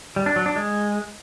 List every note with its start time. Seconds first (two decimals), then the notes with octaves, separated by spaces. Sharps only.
0.16 G3
0.26 D4
0.36 F#3
0.46 D4
0.56 G#3